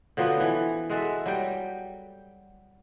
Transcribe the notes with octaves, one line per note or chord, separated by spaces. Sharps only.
D3 F3 F#3 B3
E3
G#3 F#4 A4 E5
F#3 G3 G5